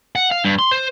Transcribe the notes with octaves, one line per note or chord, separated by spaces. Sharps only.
F#5
F5
G2
C6
C5